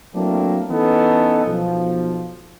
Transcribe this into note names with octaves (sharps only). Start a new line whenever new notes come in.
F#3 A3 A#3 C4 D4 E4
E3 B3 C#4 D#4 A4
B1 F3